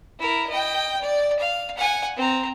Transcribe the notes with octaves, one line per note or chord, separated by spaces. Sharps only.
E4 A#4
D#5 G5
D5
F5
F#5 G#5
C4 A#5